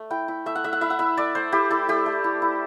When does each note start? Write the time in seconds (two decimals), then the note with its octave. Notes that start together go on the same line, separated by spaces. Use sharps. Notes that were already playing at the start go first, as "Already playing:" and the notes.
Already playing: A3
0.10 E4 G5
0.28 E4
0.46 A3 E5
0.55 F#5
0.64 A3 E5
0.73 F#5
0.81 E4 E5
0.90 F#5
0.99 E4 E5
1.17 A3 D5
1.35 A3 C5
1.52 E4 G4
1.71 E4 A4
1.88 A3 G4
2.06 A3
2.24 E4
2.42 E4